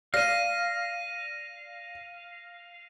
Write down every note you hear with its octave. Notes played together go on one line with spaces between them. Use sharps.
D5 F5 A#6 D#7